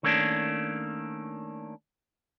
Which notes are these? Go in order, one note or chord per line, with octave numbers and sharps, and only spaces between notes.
D#3 A3 A#3 C#4 D4